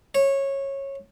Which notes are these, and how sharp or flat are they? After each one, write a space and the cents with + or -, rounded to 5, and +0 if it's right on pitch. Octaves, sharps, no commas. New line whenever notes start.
C#5 -15